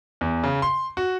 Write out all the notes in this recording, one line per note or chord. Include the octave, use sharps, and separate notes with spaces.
E2
C#3
C6
F#4